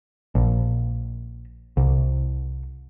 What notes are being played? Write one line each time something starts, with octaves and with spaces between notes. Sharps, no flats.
A#1
C2